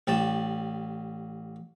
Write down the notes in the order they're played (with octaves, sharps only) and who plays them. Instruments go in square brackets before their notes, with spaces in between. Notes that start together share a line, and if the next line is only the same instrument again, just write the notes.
[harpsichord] A1 G3 A5